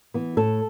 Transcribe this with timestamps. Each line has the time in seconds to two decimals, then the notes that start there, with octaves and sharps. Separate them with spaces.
0.14 E3 B3
0.37 A2 A4